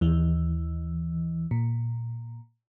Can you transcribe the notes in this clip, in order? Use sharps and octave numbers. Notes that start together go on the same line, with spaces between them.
D#2 E3
A#2